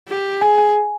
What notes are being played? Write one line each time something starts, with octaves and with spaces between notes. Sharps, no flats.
G4
G#4 G#5
G#5